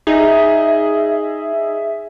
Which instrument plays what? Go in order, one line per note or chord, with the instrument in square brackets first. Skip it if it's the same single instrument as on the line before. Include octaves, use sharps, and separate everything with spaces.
[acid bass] D#4 [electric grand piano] G#4 D#5 [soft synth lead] E5